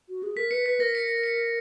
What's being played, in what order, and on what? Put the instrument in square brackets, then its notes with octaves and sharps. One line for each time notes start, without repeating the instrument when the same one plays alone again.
[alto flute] F#4
G#4
[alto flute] A#4 [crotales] B6
[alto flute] B4 [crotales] C#7
[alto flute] B4 [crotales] B6
[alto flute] A#4 [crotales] A#6
[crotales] C#7
C#7